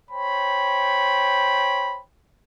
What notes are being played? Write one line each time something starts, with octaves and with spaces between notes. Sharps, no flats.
C5 C#5 G5 B5